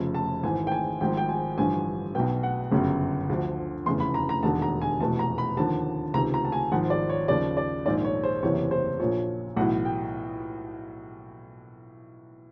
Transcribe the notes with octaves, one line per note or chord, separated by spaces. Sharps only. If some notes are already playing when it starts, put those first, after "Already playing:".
Already playing: F1 F2 C#3
A5
G#1 G#2 E3 G#5
G5
G#5
G#1 G#2 F3 G5
G5
G#5
A1 G2 D3 F3 G#5
B1 B2 G5
F#5
G1 F#2 C#3
D2 D3 F3
F1 E2 C#3 E3 C6
B5
A#5
A#5
E1 D#2 D3 A5
A#5
G#5
F1 E2 B2 A5
A#5
B5
D#2 D3 F3 A5
C#2 C3 D#3 A#5
A#5
A5
G#5
G#1 G#2 F3 F#5
D5
C#5
D#2 C#3 F3 D5
D5
A#1 G#2 D#3 D5
C#5
C5
F#1 E2 C3 E3 C#5
C5
A#1 A#2 F3 C#5
B1 A2 E3 F#5
G5